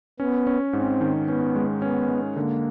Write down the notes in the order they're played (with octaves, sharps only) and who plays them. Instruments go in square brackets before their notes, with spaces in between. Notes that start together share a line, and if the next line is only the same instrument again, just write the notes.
[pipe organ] B3 [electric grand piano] C#4
[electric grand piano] C#4
[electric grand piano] G#2 [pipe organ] C4
[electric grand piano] D#3
[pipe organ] B3 [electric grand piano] C#4
[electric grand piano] G#3
[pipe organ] B3 [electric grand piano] C#4
[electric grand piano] G#3
[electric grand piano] D3 [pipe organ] A#3